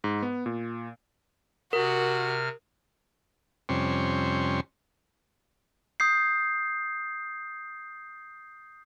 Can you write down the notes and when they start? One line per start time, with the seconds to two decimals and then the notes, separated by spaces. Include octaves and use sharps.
0.04 G#2
0.23 B3
0.46 A#2
1.73 C3 F#4 A#4 F6
3.69 F2 C3 G3 C#4 C6 C#6
6.00 D#6 G6 C7